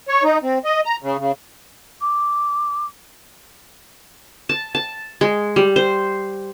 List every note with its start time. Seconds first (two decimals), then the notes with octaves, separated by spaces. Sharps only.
0.08 C#5
0.23 D#4
0.43 C4
0.65 D#5
0.85 A#5
1.03 C#3
1.19 C#3
2.01 D6
4.49 A5
4.75 A5
5.21 G#3
5.56 G3
5.76 C5